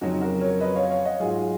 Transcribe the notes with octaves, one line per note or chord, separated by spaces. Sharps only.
F2 C#3 F#3 D#4 F#4
F#4 A#4
A#4 C#5
B4 D#5
C#5 F5
C#5 F5
D#5 F#5
G#2 F#3 F4 G#4